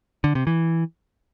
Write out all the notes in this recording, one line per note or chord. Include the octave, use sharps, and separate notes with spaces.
D3
C3
E3